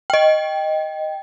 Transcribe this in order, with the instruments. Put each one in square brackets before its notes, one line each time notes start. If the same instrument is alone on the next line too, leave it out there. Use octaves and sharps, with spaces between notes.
[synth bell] D#5 G5